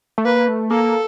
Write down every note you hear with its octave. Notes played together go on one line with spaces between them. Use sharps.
A3
A#3 B4
A3
A#3 A4